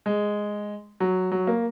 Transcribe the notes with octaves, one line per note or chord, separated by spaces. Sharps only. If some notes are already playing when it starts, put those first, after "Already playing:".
G#3
F#3
F#3
A#3